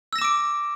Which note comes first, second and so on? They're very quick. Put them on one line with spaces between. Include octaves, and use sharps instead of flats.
E6 A#6 E7 D6 D7